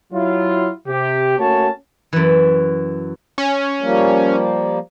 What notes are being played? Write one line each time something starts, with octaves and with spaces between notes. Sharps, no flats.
F#3 E4 F4
C3 G4
A3 A#3 C#4 F#4 C#5 A5
F#2 E3
C#4
F3 G3 A#3